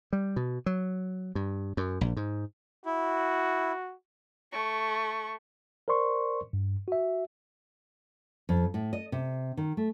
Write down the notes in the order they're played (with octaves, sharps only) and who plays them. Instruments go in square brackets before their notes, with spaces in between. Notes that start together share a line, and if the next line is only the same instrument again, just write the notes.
[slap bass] G3
B2
F#3
G2
F#2
A#1
G#2
[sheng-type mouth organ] E4 [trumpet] F#4
[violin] A3 C#6
[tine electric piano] A#4 C5 D5 C6 C#6
G2
F#4 E5
[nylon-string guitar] F2
A2
D#5
C3
D#3
A3